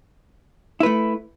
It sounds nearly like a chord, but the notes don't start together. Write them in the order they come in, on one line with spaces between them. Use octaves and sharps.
E4 B4 A3